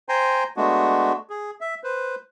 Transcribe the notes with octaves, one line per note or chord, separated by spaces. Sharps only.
C5 G5 G#5 A#5 C6
G#3 A3 B3 D4 F#4
G#4
E5
B4 C5